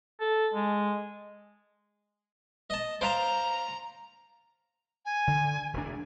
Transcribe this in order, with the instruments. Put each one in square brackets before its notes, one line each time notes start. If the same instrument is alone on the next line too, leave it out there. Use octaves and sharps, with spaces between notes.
[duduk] A4
G#3
[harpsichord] D#5 A5
[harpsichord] C5 F5 A5 [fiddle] A#5
[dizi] G#5
[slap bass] D3
E1 D2 D4